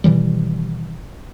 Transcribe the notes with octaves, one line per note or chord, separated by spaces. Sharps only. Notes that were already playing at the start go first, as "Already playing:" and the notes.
B2 D#3 E3 G3